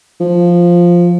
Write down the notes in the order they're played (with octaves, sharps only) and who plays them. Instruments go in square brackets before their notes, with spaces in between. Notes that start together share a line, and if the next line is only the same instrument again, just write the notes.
[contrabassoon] F3